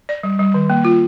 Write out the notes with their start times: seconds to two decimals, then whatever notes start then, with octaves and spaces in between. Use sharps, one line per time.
0.09 D5
0.23 G3
0.39 G3
0.54 D#3
0.70 A#3
0.85 F4